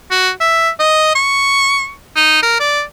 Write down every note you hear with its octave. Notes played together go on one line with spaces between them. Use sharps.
F#4
E5
D#5
C#6
D#4
A#4
D5